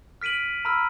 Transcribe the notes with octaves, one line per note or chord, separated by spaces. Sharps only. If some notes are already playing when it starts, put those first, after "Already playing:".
F6 B6 D7 D#7 F#7
A#5 B5 E6 F6